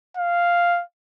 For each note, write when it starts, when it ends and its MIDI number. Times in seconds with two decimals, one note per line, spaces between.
0.17 0.82 77